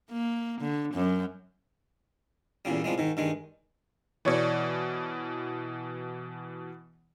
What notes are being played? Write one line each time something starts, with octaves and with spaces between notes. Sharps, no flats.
A#3
D3
F#2
E2 A#2 C#3 G3
C2 F3 G3 G#3
G#2 D#3
G2 D#3 G#3
B2 E3 C#5 D5